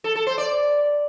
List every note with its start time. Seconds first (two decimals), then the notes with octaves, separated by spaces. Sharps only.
0.04 A4
0.15 A4
0.27 C5
0.38 D5